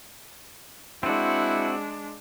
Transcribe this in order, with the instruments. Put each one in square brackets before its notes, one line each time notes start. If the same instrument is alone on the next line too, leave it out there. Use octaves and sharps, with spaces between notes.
[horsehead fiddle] G#3 D4 [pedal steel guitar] C4 F#4 [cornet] E4